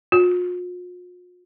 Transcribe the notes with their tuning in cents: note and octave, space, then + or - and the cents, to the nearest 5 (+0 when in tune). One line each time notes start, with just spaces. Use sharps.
F4 +45